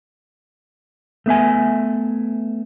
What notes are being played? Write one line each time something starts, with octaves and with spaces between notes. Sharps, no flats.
A3 B3 E5 G#5